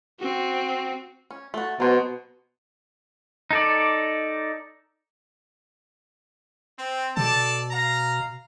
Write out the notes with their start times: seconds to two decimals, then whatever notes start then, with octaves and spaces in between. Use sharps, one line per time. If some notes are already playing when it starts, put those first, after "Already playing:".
0.20 C4 F#4
1.31 C#4
1.54 A3 F#4
1.80 B2 F#3 C5
3.51 D#4 A4 D5
6.79 C4
7.17 B2 A4 D5 A5
7.72 F5 A#5